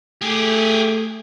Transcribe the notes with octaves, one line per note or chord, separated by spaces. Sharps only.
A3 G4 G#4